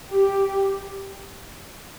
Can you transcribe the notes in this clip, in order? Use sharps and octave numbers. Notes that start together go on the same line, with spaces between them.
G4